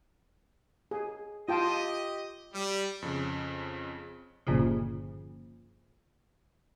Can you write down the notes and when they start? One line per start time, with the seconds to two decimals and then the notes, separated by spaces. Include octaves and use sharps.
0.91 G#4
1.49 F4 G4 D#5 G5 A5
2.54 G3
3.02 F2 C#3
4.47 G1 A#2 C#3 F3